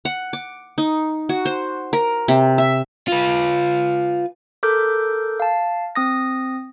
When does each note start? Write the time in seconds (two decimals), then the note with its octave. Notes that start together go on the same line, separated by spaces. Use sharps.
0.05 F#5
0.33 D6
0.78 D#4
1.29 F#4
1.45 C5
1.93 A#4
2.28 C3
2.58 E5
3.08 F4 B4
4.63 A4 A#4 D6 G6
5.40 F5 A5
5.95 C4 D#6 A#6